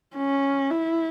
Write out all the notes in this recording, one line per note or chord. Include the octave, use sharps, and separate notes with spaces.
C#4
E4